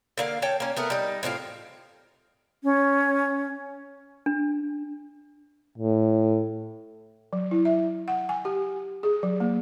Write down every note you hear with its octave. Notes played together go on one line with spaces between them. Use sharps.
D3 A#3 F5
C#5 G5 A5
A#3 C#4
A3 B3 A#4
G3 D#4
A2 C4 E4 F4
C#4
D4
A2
F#3
E4
E5
F#5
G#5
G4
G#4
F#3
A#3